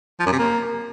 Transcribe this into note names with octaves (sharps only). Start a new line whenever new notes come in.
F3
F#2
C3
A#3